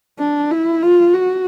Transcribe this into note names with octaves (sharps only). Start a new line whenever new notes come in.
D4
E4
F4
F#4